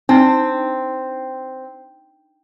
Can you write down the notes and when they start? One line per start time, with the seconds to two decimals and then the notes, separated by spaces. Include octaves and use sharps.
0.09 C4 D4 D#4